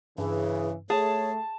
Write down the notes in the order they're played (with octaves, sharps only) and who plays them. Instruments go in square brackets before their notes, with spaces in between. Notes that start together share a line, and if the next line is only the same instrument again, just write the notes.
[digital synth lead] G2 [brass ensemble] C#3 E3 [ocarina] G#4
[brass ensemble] A3 [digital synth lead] G#4 [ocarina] C#5 [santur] A5